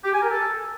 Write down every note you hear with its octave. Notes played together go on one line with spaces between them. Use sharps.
G4
G#5
A#4
A4